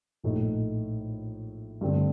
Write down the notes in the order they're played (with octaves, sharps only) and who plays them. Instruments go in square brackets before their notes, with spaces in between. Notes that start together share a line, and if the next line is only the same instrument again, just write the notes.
[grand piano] A#1 A2 A3 D#4
G2 D3 A3 C4